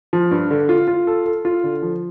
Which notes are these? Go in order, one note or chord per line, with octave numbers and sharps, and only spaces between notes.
F3
G2
D3
F4
F4
A4
A4
F4
D3
F3